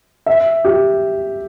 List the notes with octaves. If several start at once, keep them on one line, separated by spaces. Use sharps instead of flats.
E5
G4